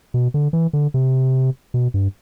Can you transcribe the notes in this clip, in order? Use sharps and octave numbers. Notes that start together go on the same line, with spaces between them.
B2
D3
E3
D3
C3
B2
G2